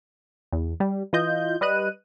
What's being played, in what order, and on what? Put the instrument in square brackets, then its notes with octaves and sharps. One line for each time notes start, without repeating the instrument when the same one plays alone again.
[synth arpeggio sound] E2
G3
E3 F4 D#5 G6
G3 B4 D#5 F#6 D#7